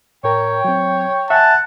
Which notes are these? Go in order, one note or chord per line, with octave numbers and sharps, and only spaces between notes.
A2 A#4 C#5 G5 A#5
F#3 C4
E5 F#5 G#5 A5